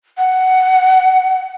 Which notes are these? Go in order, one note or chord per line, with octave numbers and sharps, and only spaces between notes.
F#5